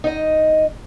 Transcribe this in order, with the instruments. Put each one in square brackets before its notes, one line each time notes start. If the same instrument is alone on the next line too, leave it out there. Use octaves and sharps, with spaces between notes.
[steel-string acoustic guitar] D#4 D#5